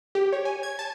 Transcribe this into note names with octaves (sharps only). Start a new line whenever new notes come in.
G4
C#5
G#5
G#6
A5